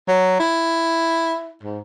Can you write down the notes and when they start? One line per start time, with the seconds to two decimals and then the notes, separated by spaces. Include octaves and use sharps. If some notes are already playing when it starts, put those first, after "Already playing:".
0.08 F#3
0.40 E4
1.63 G#2